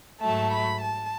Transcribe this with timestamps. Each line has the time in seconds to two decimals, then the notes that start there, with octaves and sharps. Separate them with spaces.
0.21 G#2 F#3 A3 A5
0.51 B5
0.81 A5